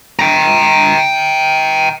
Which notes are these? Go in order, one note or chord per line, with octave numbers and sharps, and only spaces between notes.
G5 A#5